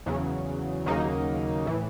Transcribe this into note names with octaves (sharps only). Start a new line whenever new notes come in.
E2 C#3 F#3
D#2 C#3 F#3 A#3 D#4
A2 E3